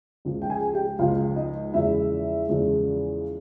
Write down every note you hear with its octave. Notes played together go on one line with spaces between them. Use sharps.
C#2 C#3 F3
G5
G#4 G#5
G4 G5
C#2 C#3 F3 F4 F5
D#4 D#5
E2 C#3 F3 G#3 E4 E5
E2 C#3 F3 G#3